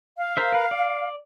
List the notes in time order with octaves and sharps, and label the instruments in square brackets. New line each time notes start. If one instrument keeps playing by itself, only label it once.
[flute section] F5
[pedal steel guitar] A#4 C5 E5
A#4 B4
D5